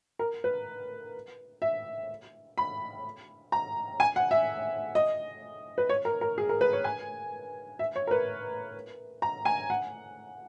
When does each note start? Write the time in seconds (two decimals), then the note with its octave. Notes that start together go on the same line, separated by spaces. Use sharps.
0.19 A#4
0.44 B4
1.62 E5
2.58 B5
3.52 A#5
4.00 G#5
4.16 F#5
4.31 E5
4.95 D#5
5.78 B4
5.89 C#5
6.05 A#4
6.21 A#4
6.38 G#4
6.49 A#4
6.61 B4
6.73 C#5
6.84 G#5
7.79 E5
7.96 C#5
8.07 A#4
8.11 B4
9.22 A#5
9.45 G#5
9.70 F#5